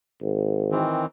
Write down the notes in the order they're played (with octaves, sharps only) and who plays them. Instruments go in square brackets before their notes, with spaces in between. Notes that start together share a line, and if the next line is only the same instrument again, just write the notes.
[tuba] G#1
[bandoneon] D#3 E3 C4